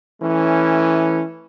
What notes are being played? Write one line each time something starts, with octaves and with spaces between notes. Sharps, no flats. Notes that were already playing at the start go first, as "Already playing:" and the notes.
E3 A3 C#4